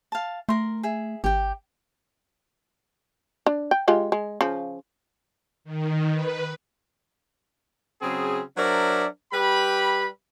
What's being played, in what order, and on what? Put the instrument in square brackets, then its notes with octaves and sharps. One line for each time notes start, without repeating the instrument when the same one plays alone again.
[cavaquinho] F5 A5
[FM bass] A3 [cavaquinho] A#4 C6
[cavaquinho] G#4 E5
[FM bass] G#1 [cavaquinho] G4 G5
[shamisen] D4
G5
G#3 F4 G4
G#3
C#3 F3
[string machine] D#3
B4
[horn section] C#3 F#3 C4 G#4
F#3 D4 A#4 C5 D5 E5
G3 G4 B4 B5